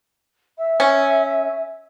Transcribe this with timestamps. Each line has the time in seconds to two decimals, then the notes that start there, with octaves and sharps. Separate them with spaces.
0.58 E5
0.80 C#4